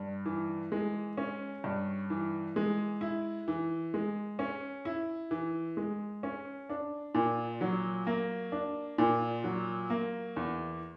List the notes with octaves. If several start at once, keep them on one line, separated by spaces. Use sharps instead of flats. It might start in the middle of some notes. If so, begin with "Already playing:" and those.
Already playing: G2
E3
G#3
C#4
G2
E3
G#3
E4
E3
G#3
C#4
E4
E3
G#3
C#4
D4
A#2
F#3
A#3
D4
A#2
F#3
A#3
E2